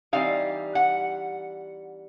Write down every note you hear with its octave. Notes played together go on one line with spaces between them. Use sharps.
E3 G3 C4 D#4 F5
F#5